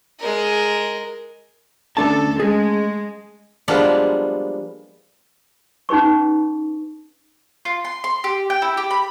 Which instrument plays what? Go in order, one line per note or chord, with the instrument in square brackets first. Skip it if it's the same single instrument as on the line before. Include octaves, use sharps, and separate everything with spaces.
[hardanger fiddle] G#3 A#4
[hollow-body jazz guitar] D2 D4 A5 [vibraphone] A3 C#4 [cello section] A4
[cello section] G#3 [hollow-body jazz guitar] G#4
[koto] F3 G3 G#3 A#3 B3 D4
[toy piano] C#4 D#4 G#4 B4 C#6
[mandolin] F4
C6
C6
G4
G5
E4
G4
B5